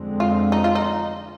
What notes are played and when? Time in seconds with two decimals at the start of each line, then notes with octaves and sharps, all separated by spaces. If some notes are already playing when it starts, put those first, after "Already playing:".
Already playing: F2 D3 G#3 C4
0.20 F4
0.52 D#4
0.64 F4
0.75 D#4